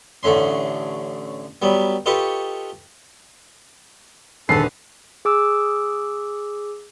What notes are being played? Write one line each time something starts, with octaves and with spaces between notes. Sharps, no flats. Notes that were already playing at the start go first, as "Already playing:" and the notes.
A1 D3 A3 C#4 C6
F#3 G3 B3
F4 G4 A4 B4 D#5 C#6
D#1 D3 G#4 A4 B4 C7
G#4 D6 E6